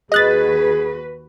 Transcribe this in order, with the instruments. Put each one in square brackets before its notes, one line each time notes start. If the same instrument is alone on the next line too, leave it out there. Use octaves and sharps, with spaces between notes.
[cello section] D#2 F#4 B4 [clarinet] G#4 [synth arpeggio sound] D#5 F#6 A6